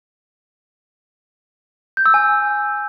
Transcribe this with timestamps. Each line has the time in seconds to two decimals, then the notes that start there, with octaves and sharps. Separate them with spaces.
1.97 G6
2.06 E6
2.14 G#5